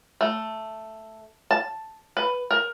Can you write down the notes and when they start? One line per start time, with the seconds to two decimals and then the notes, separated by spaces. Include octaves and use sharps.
0.21 A3
1.51 A5
2.17 B4
2.51 A#4